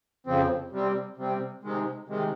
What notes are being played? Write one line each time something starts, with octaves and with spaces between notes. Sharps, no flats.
F2 C#3 F3 C4
C3 G3 C4
C3 G3 C4
C3 D#3 G#3
C3 D#3 G#3